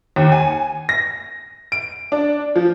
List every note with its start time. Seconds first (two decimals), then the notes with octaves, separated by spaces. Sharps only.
0.16 D#2
0.32 G#5
0.89 A#6
1.72 D7
2.12 D4
2.56 F3